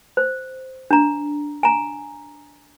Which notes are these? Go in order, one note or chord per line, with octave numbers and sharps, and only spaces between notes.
C5
D4 A#5
G#5 A#5